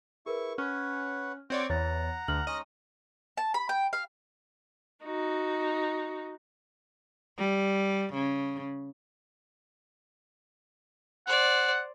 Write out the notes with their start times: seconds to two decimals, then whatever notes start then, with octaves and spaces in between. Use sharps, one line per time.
0.26 E4 G#4 A#4 B4 C#6
0.58 C#4 B4 C#5 F#5 F6
1.50 C4 F#4 C#5 D5
1.70 E2 C#5 F#5 A#5 A6
2.28 D2 F6 F#7
2.47 G#3 C#4 D#4 D#5
3.37 A5
3.54 B5
3.69 G5
3.93 F5
5.04 D#4 F#4
7.38 G3
8.14 C#3
11.27 C5 D5 F#5